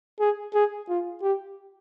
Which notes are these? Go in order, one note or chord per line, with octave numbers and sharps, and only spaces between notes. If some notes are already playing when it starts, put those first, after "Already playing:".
G#4
G#4
F4
G4